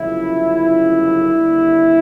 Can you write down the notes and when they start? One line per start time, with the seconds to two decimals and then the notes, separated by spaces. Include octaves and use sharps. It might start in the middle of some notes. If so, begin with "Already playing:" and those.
Already playing: G1 F#2 C#3 F3 E4
1.32 D#2 D3 G3